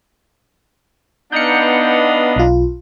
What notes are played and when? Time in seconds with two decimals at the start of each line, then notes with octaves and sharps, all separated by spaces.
1.32 B3 D4 D#4 F5 G6 C#7
2.36 B1 F4